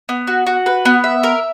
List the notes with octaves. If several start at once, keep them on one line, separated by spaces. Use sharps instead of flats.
B3
F#4
F#4
B4
B3
E5
A#4